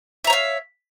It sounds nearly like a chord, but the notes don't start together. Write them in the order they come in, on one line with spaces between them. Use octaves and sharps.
E5 A#5 C#5 F5